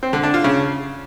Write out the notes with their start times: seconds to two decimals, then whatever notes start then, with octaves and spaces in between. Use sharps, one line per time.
0.03 C4
0.13 D3
0.23 D4
0.34 F4
0.44 C#3